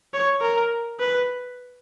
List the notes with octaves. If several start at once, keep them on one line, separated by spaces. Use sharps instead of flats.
C#5
A#4
B4